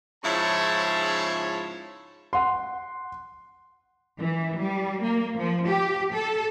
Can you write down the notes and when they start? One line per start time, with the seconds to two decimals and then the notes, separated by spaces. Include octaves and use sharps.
0.24 G#2 C#3 F3 E4 C#5 A5
2.33 F#5 C6
4.19 E3
4.59 G3
5.03 A#3
5.38 F3
5.68 G4
6.14 A4